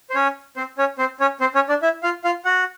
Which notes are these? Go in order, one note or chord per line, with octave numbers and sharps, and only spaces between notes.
C5
C#4 C#5
C4 C5
C#4 C#5
C4 C5
C#4 C#5
C4 C5
C#4 C#5
D4 D5
E4 E5
F4 F5
F4 F5
F#4 F#5